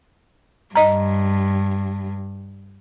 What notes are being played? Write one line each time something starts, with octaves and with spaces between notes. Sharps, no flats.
G2 D#5 A#5